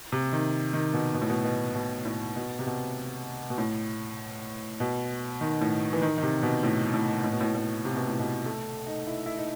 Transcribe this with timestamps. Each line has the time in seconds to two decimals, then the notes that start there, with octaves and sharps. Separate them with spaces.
0.12 C3
0.33 D#3
0.73 D#3
0.93 B2
1.14 B2
1.22 A2
1.30 B2
1.44 B2
1.75 B2
2.05 A2
2.36 B2
2.59 C3
2.66 B2
3.50 B2
3.58 A2
4.80 B2
5.41 D#3
5.61 A2
5.93 E3
6.02 D#3
6.18 D#3
6.23 C3
6.43 B2
6.63 A2
6.94 A2
7.24 A2
7.32 B2
7.41 A2
7.55 A2
7.85 C3
7.97 B2
8.08 A2
8.19 B2
8.46 A3
8.87 D#4
9.07 E4
9.26 E4
9.37 D#4